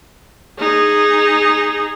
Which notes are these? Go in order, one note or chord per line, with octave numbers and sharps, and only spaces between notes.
D#4 G#4